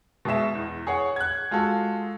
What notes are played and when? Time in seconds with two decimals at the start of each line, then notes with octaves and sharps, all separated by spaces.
0.25 B2 G#3 G#4 E5 E7
0.55 E2
0.87 G#4 C#5 F#5
1.16 F#6 G#6
1.51 G#3 F4 F#4 A4